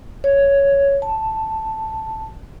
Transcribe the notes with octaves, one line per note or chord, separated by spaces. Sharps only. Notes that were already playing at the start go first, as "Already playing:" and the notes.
C#5
A5